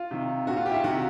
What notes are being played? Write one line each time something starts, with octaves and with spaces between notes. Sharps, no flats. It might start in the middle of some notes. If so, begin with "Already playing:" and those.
Already playing: F4
C3 D#3
A#2 F#4
F4
E4 G4
F4
C3 D#3 F#4